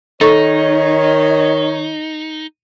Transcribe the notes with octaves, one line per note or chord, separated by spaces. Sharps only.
D#3 D#4 A4 C#5 C#6